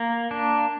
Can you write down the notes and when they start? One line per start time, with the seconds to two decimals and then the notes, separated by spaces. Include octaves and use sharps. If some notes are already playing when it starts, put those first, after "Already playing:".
Already playing: A#3
0.31 D4